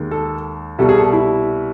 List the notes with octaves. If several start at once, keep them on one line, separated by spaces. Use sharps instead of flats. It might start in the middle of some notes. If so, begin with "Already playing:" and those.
Already playing: D#2 D#3 G#3
A4
C2 B2 G3 A4
G#4
A4
E4